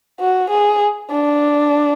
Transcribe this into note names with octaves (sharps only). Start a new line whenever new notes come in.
F#4
G#4
D4